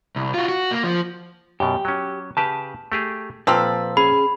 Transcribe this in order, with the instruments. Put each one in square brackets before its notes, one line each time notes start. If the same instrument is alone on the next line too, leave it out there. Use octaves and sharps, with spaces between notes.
[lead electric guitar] C2
F4 F#4
F#4
A#3
F3
[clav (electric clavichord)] F#2 B2 [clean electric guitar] G4
[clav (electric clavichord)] F#3 C#4
[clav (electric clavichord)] C#3 G4 B4 [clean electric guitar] A5
[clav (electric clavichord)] A3 G4 G#4
[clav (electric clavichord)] A#2 F3 [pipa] C4 F4 A4 [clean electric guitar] B4
[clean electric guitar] C#4 G#4 [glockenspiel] B5